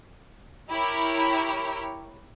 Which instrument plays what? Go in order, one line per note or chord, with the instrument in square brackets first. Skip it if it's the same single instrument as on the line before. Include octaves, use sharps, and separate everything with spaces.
[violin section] E4 G4 A#4 C#5